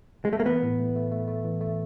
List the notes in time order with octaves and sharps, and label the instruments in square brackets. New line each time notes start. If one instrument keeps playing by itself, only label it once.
[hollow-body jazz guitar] G#3
A3
A#3
[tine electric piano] E3 [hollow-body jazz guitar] B3
[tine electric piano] A2
A3
A3
A3
A3
E3
A3